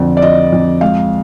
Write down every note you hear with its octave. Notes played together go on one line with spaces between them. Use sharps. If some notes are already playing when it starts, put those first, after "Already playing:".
Already playing: F2 D3
D5
F2 D#5
F2
G#3 F5